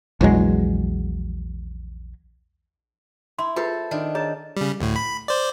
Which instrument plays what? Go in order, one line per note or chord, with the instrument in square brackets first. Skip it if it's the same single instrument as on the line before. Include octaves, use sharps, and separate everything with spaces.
[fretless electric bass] A#1 E2 F#3 G#3
[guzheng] E4 [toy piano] C6
[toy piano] F4 G#4 B4 [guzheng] A4 C5
[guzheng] D#3 D4
[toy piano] G#4 C#5 A#5 [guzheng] A5
[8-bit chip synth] C#3 G3
D2 A2
B5
C5 D5